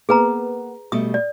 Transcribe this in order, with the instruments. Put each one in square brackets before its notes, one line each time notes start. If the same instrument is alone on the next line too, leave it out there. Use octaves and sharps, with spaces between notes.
[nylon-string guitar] A#3 B3 [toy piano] G#4 B4 A#5
[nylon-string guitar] B2 G3 A3 [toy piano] D#6
[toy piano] D5